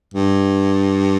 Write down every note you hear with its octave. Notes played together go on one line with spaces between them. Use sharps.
G2